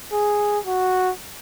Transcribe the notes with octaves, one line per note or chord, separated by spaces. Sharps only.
G#4
F#4